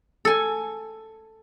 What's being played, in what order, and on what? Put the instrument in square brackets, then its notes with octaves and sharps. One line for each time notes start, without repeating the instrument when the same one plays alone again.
[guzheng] A4 G#5